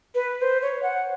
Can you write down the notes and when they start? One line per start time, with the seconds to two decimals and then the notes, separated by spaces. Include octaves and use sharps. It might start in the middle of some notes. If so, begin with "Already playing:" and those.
0.15 B4
0.42 C5
0.62 C#5
0.83 F#5